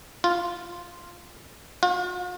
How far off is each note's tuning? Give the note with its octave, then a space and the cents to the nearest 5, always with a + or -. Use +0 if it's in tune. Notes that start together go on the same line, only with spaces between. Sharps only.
F4 -5
F4 +45